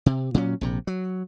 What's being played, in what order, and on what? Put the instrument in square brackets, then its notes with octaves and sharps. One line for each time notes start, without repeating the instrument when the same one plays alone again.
[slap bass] C3
A#2 F#3 C#4
A#1 C3
F#3